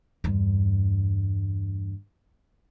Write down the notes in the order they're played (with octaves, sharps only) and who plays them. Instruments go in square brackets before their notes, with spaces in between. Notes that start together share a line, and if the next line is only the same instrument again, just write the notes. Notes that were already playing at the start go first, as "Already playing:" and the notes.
[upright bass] E2 G2